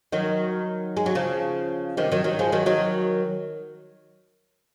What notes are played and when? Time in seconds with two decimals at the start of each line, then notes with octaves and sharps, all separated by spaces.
0.12 D#3 F#3
0.97 G#3
1.06 F#3
1.15 C#3 F3
1.97 C3 D#3
2.12 D#3 F#3
2.24 D#3 F#3
2.39 F3 G#3
2.52 D#3 F#3
2.66 D#3 F#3